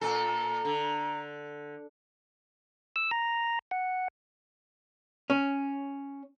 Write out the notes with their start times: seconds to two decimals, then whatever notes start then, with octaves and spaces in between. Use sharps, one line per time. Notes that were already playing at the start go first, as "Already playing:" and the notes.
0.01 A#2 A4 A#5
0.65 D3
2.96 E6
3.11 A#5
3.71 F#5
5.30 C#4